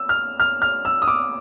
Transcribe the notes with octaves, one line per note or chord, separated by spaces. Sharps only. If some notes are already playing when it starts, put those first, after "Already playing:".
Already playing: E6
F6
F6
F6
E6
D#6
D6